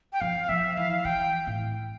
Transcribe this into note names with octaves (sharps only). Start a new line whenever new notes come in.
G5
F3 F5
F3 E5
E3 F5
E3 G5
A2